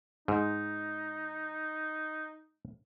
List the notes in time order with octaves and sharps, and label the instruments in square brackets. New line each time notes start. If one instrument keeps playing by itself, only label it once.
[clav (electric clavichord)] G#2 [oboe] D#4